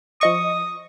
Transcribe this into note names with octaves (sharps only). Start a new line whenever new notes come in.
F3 D#5 C#6 D#6